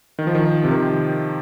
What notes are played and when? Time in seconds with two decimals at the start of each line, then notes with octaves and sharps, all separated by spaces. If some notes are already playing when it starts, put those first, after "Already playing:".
0.19 D#3
0.27 F3
0.35 D#3
0.64 C3
0.72 D#3